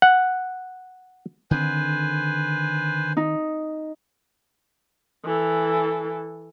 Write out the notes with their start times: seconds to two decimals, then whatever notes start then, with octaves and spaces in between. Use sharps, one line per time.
0.02 F#5
1.51 D3 D#3 C4 B4 C5 G#5
3.17 D#4
5.25 E3 A4